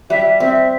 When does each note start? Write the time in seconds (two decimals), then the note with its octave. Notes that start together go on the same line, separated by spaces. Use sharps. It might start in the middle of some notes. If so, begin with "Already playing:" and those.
0.10 G3 E5
0.40 C4 E5